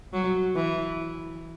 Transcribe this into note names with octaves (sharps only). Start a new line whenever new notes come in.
F#3
E3